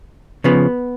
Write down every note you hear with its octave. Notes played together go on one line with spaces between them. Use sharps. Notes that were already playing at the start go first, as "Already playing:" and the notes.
C#3 F3 B3